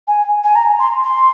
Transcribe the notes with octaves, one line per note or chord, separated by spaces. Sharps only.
G#5
G#5
A#5
C6
C6